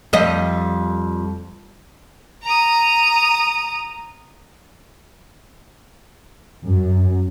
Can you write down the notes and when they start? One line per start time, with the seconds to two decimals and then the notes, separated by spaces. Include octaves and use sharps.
0.13 F2 G3 D#5
2.43 A#5 D#6
6.65 F#2